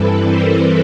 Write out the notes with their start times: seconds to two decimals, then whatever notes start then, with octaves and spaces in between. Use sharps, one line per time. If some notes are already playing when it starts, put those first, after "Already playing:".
Already playing: G2 E3 G3 C4 E4 A4 B4
0.25 A#4 C5